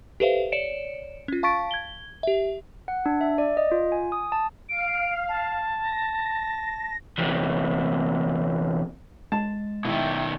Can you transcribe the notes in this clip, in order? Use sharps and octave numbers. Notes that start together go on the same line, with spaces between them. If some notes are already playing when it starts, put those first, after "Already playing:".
G4 A4 B4 C5 E5 F5
C#5 D5 C#7 D7 E7
C#4 F4
F5 A5 C#6 A6 B6 D7
G#6 G7
G4 E5
F#5
D4
E5
D5
D#5
F4
G#5
D#6
A5
F5 D7
A5
A#6
E2 C3
G#3 A5
B2 D#3 E4 E5 G5